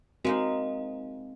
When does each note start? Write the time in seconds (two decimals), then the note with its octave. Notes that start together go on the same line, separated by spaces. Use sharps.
0.25 G#3 A#3 C4 D#4 F#4 A#4